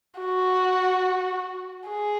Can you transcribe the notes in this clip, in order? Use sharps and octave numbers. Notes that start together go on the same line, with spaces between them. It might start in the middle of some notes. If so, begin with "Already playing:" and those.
F#4
G#4